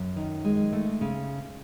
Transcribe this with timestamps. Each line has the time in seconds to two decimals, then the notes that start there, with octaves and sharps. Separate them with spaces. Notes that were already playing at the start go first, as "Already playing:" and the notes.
Already playing: F#2
0.16 D#3
0.44 G#3
0.72 A3
1.01 C#3